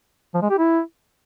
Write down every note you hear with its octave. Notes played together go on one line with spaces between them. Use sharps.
F3
G#3
G4
E4